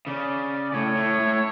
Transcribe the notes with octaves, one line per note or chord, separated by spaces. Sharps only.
C#3 D5
D5
A2 C#5
A2
A2